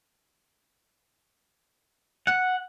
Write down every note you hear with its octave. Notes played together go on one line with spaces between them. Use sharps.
F#5